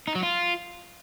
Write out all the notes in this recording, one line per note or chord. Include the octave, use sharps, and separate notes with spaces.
D#4
F#3
F4